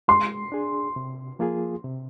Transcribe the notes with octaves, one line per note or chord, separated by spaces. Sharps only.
G#3 C6
D4 G#4
C3
F3 A#3 F4 G#4
C3